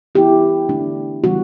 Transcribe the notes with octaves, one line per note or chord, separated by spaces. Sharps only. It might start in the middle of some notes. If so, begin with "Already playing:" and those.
E3 B3 E4 G4
D3 A3 D4
C#3 E3 G3 B3 F#4